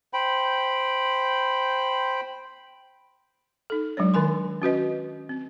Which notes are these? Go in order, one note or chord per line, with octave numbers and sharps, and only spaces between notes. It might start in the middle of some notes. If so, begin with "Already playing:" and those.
C5 G5 B5
D#4 A4
F#3 G#3 D4 C#5
D#3 A#4 G#5 C6
C#4 F#4 B4 D#5
C4